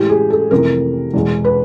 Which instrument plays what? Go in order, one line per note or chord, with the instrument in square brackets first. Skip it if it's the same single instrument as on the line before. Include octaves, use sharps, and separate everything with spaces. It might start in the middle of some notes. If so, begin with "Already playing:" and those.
Already playing: [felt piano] A2 E3 G#3 G4
G#4
A4
F2 C3 E3 A3 A#4
E2 B2 G#3
B4